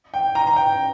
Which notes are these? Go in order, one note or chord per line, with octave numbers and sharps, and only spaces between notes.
G5
A#5
A#5
G5